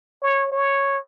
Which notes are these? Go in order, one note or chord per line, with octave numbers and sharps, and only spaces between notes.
C#5
C#5